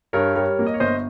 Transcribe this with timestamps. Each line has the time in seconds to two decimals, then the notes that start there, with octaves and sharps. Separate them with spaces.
0.13 G2 A#4 C#5
0.35 G3 A#4 C#5
0.59 A#3
0.67 D#5
0.74 C#5
0.80 G1 C5 D#5